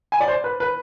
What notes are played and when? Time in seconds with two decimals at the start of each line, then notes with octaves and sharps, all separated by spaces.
0.12 G#5
0.21 D5
0.28 C5
0.44 B4
0.60 B4